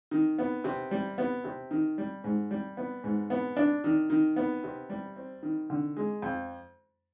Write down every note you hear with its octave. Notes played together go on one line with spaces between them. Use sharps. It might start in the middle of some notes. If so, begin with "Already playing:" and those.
D#3
B3
C3
G3
B3
C3
D#3
G3
G#2
G3
B3
G#2
B3
D4
D#3
D#3
B3
C3
G3
C4
D#3
D3
G#3
F2